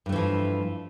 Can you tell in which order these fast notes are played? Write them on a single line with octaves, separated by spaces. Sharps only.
G2 A3 E3 F3